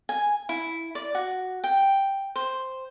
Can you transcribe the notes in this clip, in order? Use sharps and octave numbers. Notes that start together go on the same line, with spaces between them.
G#5
E4
D5
F#4
G5
C5